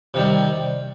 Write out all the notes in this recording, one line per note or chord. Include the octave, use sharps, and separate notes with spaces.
C3 D#3 G3